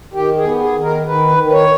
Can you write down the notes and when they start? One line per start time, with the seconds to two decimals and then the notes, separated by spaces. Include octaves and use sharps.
0.14 D#3 G4
0.37 G#4
0.44 B3
0.60 G#4
0.76 D#3
0.83 A#4
1.06 D#3 B4
1.37 D#3
1.48 B4
1.52 C#5